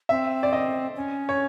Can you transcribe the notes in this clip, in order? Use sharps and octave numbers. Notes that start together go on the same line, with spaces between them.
C4 E5
D5
D#5
C#4
C#5